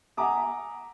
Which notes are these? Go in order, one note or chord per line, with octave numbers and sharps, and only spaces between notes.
E5 F#5 G#5 A#5 D6 D#6